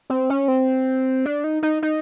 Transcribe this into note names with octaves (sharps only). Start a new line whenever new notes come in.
C4
C#4
C4
D4
D#4
D#4
D#4